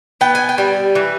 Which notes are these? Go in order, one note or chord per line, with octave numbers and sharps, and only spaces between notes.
B3 G5
G#5
G5
G3
E3